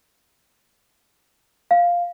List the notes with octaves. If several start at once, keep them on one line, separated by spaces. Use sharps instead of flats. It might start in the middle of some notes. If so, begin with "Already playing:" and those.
F5